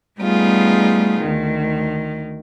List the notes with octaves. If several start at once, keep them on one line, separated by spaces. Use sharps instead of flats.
G3 A3 B3 D#4 F4 G#4
D2 D#3